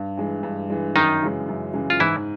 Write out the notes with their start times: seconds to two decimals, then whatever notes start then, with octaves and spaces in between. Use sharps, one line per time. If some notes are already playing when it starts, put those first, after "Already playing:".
Already playing: G2
0.17 E3 G#3
0.43 G2
0.70 E3 G#3
0.96 F#2 D#3 D#4
1.22 C#3 E3 G#3
1.48 F#2
1.74 C#3 E3 G#3
1.90 F4
2.00 G#2 E3 E4